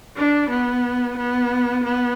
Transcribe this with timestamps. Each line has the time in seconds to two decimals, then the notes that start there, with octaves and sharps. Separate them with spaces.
0.16 D4
0.50 B3
1.17 B3
1.84 B3